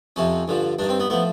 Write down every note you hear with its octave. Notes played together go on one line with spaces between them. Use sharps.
F2 C3 F3 C#4
G2 D3 F3
G2 D#3 D4
C4
B3
A2 F3 B3